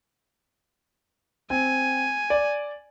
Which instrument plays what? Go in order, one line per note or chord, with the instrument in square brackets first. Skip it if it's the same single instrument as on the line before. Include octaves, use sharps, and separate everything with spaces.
[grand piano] C4 [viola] G#5
[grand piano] D5